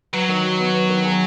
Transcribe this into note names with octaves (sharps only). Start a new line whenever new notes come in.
F#3 B4
D#3
F#4
B3
B4
D#3
G#4